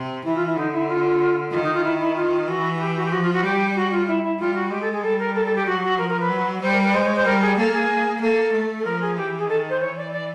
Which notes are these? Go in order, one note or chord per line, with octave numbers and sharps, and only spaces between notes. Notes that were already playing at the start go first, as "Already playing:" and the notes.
Already playing: C3
E3 E4
F4
E4
D3 D#4
E4
F4
D#3 F4
D#4
F4
E4
E4
F4
E3 F#4
F#4
G4
F#4
G4
F3 F#4
F4
F#4
G3 G4
F#4
F4
E4
E4
G3 F4
F#4
G#3 G4
A4
G#4
G3 A4
A#4
A4
A4
G4
F#3 F#4
F#4
F3 A#4
A#4
B4
F#3
G3 C5
A#4
B4
G#3 C5
C#5
C5
G3 A#4
G#4
A#3 A4
G#4
A#3 A4
A3
A4
F3 A#4
G#4
E3 G4
G#4
D#3 A4
C5
E3 C#5
D5
D5